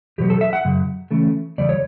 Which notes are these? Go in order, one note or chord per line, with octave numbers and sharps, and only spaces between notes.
E2 B2 F#3 B3 G4
A4
E5
F#5
F#2 C#3
C#3 E3 A3
E2 C#3 G3 D5
C#5